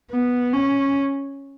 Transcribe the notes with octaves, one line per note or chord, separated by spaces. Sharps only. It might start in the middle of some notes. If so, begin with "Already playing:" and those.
B3
C#4